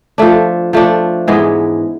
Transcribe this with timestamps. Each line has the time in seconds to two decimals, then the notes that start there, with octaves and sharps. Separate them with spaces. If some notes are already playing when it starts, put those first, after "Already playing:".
0.18 F3 A3 D4
0.73 F3 A3 D4
1.28 G#2 E3 G#3 B3